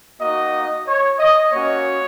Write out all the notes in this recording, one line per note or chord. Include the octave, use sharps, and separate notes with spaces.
A#3 D#4 F#4 D#5
C#5
D#5
A#3 C#4 F#4 C#5